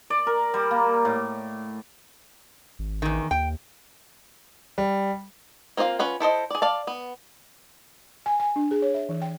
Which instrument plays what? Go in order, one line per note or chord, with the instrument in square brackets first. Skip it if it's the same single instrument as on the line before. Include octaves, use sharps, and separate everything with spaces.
[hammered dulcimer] D5
A#4
G3
A#3
A2
[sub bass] G#1
[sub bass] A1 [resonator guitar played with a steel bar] E2 D#3
[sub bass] D#2 [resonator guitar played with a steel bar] G5
[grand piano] G3
[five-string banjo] A#3 C4 F4 D5 F5
C#4 F4 B4 F#5
E4 A4 C5 D#5
G#4 D5
D5 F5 A5
B3
[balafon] G#5
G#5
D4
G#4
C#5
E5
E3
G5